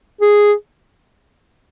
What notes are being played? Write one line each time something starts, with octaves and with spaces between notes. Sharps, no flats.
G#4